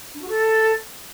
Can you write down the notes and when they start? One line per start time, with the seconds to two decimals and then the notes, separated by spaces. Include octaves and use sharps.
0.14 D4
0.21 F#4
0.29 A4